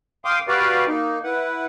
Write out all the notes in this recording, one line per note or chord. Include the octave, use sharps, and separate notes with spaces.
F5 G5 C6 D6 D#6
F#4 G4 B4 D5 F5
A#3 D#4
E4 B4 F#5